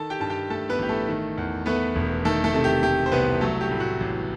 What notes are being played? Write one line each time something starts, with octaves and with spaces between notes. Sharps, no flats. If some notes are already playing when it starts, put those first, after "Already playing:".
Already playing: D#3 A4 A5
G4 G5
G2 A5
G4 G5
A3 A4 A5
B3 B4
A1 G4
A3 A4
D#3
E2
A3 B3 B4
E1
D#3 A3 A4
A3 A4
C3 A4
G4
A3 G4
C5
C2 B3 B4
F#3 A3 A4
G4
A2
F#4
A1